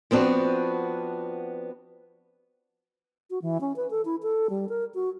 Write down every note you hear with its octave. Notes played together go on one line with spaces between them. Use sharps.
F3 B3 C4 D4 F#4
F#4
E3
C#4
B4
A4
E4
A4
G3
A#4
F#4